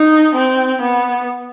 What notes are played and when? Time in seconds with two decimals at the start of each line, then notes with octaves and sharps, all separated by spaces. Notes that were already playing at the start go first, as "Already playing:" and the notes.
Already playing: D#4
0.35 C4
0.81 B3